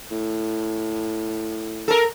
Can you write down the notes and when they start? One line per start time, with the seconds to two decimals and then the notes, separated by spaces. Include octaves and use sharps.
0.11 A2
1.88 A4 A#4